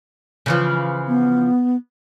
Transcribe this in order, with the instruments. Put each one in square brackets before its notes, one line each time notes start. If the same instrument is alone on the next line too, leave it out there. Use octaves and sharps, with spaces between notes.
[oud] C#3 E3 F3
[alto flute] B3